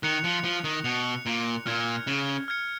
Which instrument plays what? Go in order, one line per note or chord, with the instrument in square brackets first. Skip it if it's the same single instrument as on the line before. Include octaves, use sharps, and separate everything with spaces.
[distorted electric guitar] D#3 [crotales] F#6 C#7 F7
[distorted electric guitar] F3
F3
D#3
[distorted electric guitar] B2 [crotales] F#6 C#7 F7
[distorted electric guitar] A#2
[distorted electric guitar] A#2 [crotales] F6 G#6 C#7
[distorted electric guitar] C#3
[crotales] F6 G#6 C#7